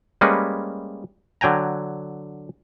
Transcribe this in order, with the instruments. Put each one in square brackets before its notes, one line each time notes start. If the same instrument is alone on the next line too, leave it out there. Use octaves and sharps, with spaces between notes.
[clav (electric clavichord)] G3 G#3 A#3 C#4 B4
D3 F#3 G5 G#5 A#5